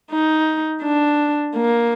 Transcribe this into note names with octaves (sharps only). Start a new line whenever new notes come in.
D#4
D4
A#3